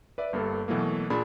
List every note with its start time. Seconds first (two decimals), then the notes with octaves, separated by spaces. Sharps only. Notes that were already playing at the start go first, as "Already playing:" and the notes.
0.18 B4 D5 E5
0.33 G1 G2 A#3 A4
0.68 B2 E3 F#3 A3 A#3
1.10 A#2 D4 G#4 B5